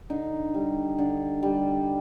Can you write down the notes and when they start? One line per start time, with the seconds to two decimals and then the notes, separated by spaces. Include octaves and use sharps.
0.10 D3 D#4
0.54 G3
0.98 D3
1.43 G3